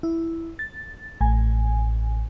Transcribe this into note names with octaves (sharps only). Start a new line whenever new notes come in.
E4
A6
A1 A2 G#5